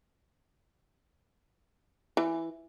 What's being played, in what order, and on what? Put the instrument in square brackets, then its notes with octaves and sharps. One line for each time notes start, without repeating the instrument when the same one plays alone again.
[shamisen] E3